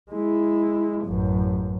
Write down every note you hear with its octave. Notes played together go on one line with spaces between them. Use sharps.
G#3 E4
A1 F#2